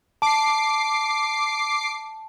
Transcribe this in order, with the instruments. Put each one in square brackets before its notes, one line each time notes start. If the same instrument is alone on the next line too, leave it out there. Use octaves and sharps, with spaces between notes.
[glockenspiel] A5 [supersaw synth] D6 C7